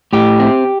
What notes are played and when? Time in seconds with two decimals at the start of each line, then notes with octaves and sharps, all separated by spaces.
0.13 A2 G4
0.40 C4